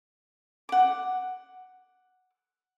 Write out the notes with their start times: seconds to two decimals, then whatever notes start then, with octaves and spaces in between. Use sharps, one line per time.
0.69 F#5 D6